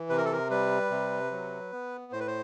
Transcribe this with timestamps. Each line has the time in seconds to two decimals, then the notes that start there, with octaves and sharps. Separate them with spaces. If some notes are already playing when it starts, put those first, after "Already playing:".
Already playing: E3
0.09 C3 B4
0.17 A#4
0.25 A4
0.32 A#4
0.50 G3 B4
0.91 C3
1.31 F#3
1.72 B3
2.12 A2 C5
2.20 B4
2.27 C5